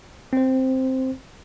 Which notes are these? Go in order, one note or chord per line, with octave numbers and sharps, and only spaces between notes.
C4 C5